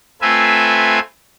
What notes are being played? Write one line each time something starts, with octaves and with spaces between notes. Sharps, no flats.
A3 C4 F4 B4 E5 G#5